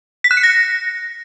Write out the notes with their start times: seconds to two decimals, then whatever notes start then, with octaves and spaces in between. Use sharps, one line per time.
0.24 B6
0.31 F#6
0.37 C#7
0.43 A#6